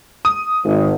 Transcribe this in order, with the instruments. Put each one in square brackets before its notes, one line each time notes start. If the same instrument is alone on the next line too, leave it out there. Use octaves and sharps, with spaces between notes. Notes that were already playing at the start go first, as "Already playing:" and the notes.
[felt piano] D#6
[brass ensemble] G#1